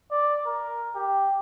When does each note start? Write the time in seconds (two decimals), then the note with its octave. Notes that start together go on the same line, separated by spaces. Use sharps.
0.11 D5
0.46 A#4
0.96 G4